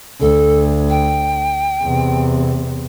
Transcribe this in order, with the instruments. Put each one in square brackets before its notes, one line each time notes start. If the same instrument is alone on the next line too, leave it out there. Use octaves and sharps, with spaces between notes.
[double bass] D2 [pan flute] A4
[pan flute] G5
[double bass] E2 C3